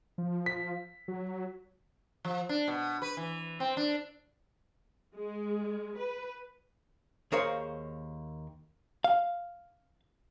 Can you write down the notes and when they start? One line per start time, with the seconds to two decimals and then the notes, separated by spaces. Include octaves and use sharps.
0.18 F3
0.46 B6
1.08 F#3
2.25 F3
2.49 D4
2.68 B2
3.02 B4
3.17 E3
3.60 C4
3.77 D4
5.15 G#3
5.97 B4
7.32 D#2 G#4 A#4 C5 C#5 F5
9.04 F5